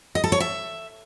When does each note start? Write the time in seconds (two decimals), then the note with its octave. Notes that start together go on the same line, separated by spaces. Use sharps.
0.15 D#5
0.24 A4
0.32 C#5
0.40 E5